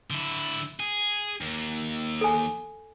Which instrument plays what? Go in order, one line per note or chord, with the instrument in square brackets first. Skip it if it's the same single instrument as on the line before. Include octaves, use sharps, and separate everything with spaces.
[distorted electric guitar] D3 E4
G#4
D#2
[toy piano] A4 G#5